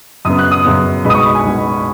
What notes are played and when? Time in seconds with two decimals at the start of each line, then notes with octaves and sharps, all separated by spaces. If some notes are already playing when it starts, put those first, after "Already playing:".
0.25 F#2 C#3 B3 D#6
0.39 F#6
0.51 D#6
0.65 F#2 C#3 B3
1.05 B1 B2 G#3 B3 B5
1.10 D#6
1.15 C#6
1.25 B5
1.35 G#5
1.45 B1 B2 G#3 B3